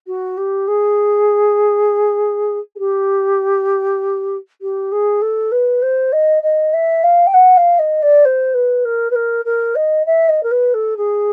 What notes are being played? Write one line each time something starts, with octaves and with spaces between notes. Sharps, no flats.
F#4
G4
G#4
G#4
G4
G4
G#4
A4
B4
C5
D#5
D#5
E5
F5
G5
F#5
F5
D#5
D5
C5
B4
A#4
B4
A#4
A#4
D#5
E5
D#5
A#4
B4
A4
G#4